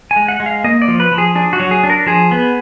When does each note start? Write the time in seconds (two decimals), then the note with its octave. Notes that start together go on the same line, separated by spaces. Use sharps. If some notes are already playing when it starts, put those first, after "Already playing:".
0.11 G#5
0.16 G#3
0.28 F#5
0.40 G#3
0.46 F5
0.64 A#3 D#5
0.82 D5
0.88 F3
1.00 B4
1.12 F3
1.18 G#4
1.35 D4 G#4
1.53 F#4
1.60 F#3
1.71 G#4
1.84 D4
1.90 A#4
2.06 F3 G#4
2.31 B3